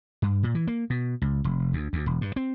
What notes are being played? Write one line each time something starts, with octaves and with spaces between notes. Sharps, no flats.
G2
A#2
E3
A#3
B2
C#2
F1
D2
D2
E1
G2
C4